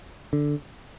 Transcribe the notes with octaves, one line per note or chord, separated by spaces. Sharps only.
D3